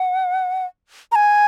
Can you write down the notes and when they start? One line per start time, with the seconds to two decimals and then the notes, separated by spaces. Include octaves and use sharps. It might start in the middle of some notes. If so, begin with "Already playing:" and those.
Already playing: F#5
1.12 A#5
1.15 G#5